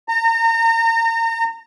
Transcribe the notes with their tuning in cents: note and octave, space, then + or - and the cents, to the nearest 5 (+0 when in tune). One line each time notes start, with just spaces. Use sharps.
A#5 -30